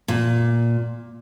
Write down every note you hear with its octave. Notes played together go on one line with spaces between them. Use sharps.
A#2